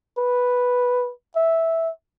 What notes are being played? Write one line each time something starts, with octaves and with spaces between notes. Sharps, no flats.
B4
E5